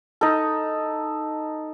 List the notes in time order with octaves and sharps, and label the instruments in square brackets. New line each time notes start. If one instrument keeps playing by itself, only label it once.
[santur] D#4 A4